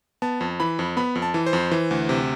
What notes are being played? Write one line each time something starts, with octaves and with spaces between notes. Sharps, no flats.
B3 A5
F2
E3 B5
F2
B3 B5
F2
A5
E3
C5
F2
E3
D2
C3